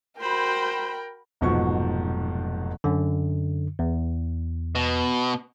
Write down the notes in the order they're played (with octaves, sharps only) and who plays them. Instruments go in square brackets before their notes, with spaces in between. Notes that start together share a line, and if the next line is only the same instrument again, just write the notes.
[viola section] F#4 B5 [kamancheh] A#4 G5 [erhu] C5
[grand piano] F1 G#2 B2 F3 F#3 C#6
[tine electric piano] F#2 D3
E2
[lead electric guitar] B2